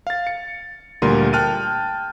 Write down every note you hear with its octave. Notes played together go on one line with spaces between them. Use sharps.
F5 A6
C#7
D2 A#2 G3 A#4 C6 D#7
G5 A5 F6 F#6 A6 D#7